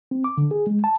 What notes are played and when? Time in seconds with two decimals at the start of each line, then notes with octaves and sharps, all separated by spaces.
0.11 C4
0.24 D6
0.38 D3
0.51 G#4
0.67 G#3
0.84 A5